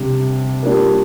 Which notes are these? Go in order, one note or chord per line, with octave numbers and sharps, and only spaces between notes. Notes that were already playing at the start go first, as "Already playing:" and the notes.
Already playing: C3 G3 D4
G3 A#3 D4 F4 A#4